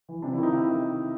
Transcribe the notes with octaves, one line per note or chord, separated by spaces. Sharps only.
E3
C3 D4
E4
D#3
D#4
E4